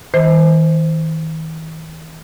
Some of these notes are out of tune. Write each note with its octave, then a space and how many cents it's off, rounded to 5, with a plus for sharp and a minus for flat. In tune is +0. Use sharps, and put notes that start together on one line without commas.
D#3 +45 C5 -10